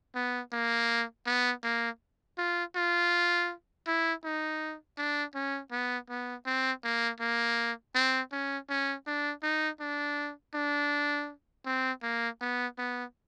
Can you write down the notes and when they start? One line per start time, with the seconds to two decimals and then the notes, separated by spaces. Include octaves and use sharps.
0.15 B3
0.52 A#3
1.26 B3
1.63 A#3
2.38 F4
2.75 F4
3.87 E4
4.24 D#4
4.98 D4
5.34 C#4
5.72 B3
6.09 B3
6.46 C4
6.84 A#3
7.20 A#3
7.95 C4
8.32 C#4
8.69 C#4
9.07 D4
9.43 D#4
9.80 D4
10.54 D4
11.65 C4
12.03 A#3
12.41 B3
12.78 B3